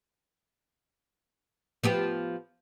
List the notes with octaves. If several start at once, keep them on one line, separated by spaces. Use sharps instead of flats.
F3 B3 G4